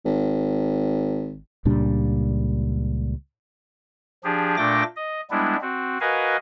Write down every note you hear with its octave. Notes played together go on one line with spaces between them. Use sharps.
G#1
C#2 A#2 G3 D4
F3 D4 G4 G#4
A#2 A3 D4 G5 D6 A#6
D#5
G3 G#3 B3 D4 E4
C4 F#4
F#4 A#4 B4 D#5 F5 G#5